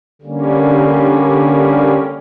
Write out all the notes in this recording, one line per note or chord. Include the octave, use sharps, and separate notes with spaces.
D3 G3 A#3 C#4